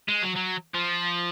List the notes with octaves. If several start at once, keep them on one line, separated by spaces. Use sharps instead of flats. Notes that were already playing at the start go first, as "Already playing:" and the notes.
G#3
F#3
F#3
F3